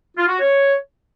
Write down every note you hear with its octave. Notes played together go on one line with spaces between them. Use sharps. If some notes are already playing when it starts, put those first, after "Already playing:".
F4
F#4
C#5